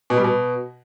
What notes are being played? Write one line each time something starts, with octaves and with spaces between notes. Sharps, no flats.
B2
G3
B2